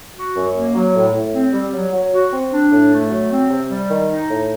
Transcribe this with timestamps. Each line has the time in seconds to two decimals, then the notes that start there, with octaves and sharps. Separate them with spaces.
0.16 F#4
0.36 F#2
0.55 A#3
0.74 F#3
0.94 A2
1.14 A2
1.34 C4
1.53 G3
1.73 F#3
1.93 F#3
2.12 F#4
2.32 C4
2.52 D4
2.71 A2
2.91 A3
3.10 F#3
3.31 C4
3.50 C3
3.70 G3
3.89 D#3
4.09 D#4
4.29 A2